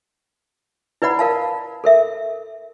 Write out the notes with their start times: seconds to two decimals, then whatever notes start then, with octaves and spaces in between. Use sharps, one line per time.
1.02 E4 B4 D5 F#5 B5
1.19 A#4 F5 A5
1.84 A4 A#4 E5